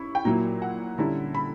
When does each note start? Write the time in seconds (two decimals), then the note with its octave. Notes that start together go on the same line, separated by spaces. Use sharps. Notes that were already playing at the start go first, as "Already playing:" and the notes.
Already playing: C#4 E4 B5 C#6
0.15 G5
0.25 A#2 F#3 A#3 E4 A#5
0.62 F#5
0.98 D3 G3 C#4 E4 A#5
1.35 B5